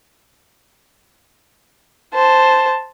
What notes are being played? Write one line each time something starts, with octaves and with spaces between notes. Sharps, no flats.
C5 A5